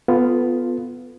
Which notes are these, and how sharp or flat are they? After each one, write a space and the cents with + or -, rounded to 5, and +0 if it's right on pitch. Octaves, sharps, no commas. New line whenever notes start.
B3 +15 F4 +0 A4 +0